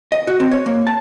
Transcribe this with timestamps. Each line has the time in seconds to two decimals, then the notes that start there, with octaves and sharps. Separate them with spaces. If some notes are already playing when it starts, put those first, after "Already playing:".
0.12 D#5
0.27 F#4
0.40 C4
0.51 C#5
0.66 A#3
0.87 A5